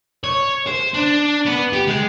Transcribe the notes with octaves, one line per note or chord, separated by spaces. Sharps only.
C#5
C5
D4
B3
G4
G#3